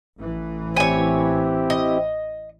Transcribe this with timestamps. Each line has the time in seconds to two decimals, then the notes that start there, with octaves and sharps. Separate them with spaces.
0.19 A1 E3
0.77 C4 E4 G4 C#5 G#5
1.70 D#5